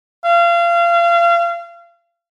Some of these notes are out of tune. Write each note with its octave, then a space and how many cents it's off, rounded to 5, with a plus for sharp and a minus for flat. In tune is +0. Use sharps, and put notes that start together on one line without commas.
F5 -30